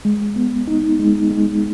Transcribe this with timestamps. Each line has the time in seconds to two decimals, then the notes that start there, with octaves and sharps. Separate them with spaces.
0.05 G#3
0.36 B3
0.67 D#4
0.99 G#3
1.31 G#3